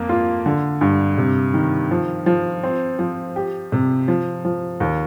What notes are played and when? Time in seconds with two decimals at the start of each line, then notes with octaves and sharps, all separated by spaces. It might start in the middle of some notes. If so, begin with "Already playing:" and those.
Already playing: F2 A#3
0.09 F4
0.46 D3
0.81 G2
1.18 C3
1.54 D#3
1.91 F3
2.26 F3
2.63 C4
2.99 F3
3.36 G4
3.72 C3
4.08 F3
4.45 F3
4.80 D#2